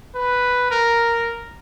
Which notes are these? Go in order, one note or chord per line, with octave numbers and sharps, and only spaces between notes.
B4
A#4